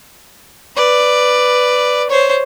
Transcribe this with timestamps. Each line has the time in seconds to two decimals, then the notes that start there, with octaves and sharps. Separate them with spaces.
0.76 B4 D5
2.10 C5 C#5